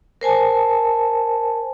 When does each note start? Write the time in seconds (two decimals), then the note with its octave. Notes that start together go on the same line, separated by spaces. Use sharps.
0.21 A#4 C5 G#5 A5